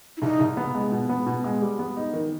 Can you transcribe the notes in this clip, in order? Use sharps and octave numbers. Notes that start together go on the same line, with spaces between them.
E4
C2 D#4
C2
B3
G#3
B2
B3
B2
G#3
G3
B3
D#4
D#3